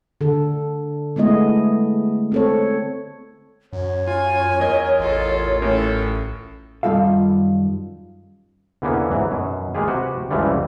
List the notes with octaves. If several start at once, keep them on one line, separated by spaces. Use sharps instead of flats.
D3 A4
G#3 A3 B3 E4 D#5
C4 A4 C#5
F#2 C#5
F4 G#5
E2 A#4 D#5
A1 F4 A4
A2 C#4 A4 A#4
F#2 D#3 G3 F4 A4 F5
E2 D3 E3 A#3 B3 C#4
G#2 E3 F#3
F#2 B2
G#3 A#3 F4 G4 G#4
C3 F#4 G4 B4
C#2 F#2 C#3 E3 F3 G3